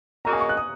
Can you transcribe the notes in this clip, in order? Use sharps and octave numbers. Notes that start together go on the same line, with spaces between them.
C#3 A#3 F#4 D#5 A#5
G#5
C#6
F#6
D#6